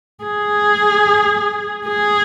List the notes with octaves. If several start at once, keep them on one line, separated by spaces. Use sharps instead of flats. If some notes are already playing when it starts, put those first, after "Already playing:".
G#4
G#4